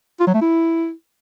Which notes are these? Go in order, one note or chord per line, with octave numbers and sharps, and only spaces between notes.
F4
F#3
A3
E4